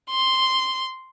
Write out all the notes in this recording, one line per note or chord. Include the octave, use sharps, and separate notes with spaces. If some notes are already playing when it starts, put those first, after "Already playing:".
C6